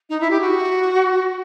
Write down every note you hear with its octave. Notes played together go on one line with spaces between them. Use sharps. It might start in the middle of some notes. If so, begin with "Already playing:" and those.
D#4
E4
G4
F#4